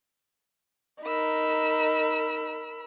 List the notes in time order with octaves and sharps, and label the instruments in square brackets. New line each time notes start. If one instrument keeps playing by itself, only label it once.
[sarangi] D#4 [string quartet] A#4 B5 E6